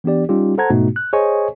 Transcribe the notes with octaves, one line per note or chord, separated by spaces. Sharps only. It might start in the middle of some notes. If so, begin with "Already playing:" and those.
E3 B3 D4 G4 D5
G3 C#4 D#4 F4 G4
A4 C5 F#5 A5 A#5 G#6
G#2 B2 A3 B3 D#4 F#4
F#6
G#4 C5 C#5 D#5 G#5 C#6